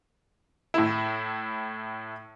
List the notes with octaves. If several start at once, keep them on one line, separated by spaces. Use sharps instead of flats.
A2 E4